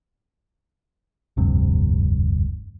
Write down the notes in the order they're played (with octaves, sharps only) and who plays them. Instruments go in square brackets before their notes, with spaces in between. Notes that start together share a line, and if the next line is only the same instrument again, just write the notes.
[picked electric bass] F1 D2 G2 C3